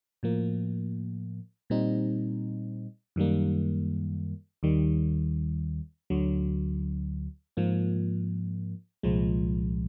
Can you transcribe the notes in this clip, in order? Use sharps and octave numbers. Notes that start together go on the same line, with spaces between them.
A2 F3 A#3
A#2 G3 C4 D#4
F#2 D#3 G3 A#3
D#2 D#3 G3
D2 D3 F#3
G#2 F3 A#3
C2 A#2 F3 G#3